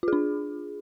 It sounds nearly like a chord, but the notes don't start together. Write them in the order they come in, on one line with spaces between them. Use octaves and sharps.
F4 G#4 D4